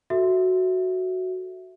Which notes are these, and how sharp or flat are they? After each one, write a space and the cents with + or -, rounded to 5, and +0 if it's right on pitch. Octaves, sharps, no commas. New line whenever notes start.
F#4 +0 A4 +0 E5 +0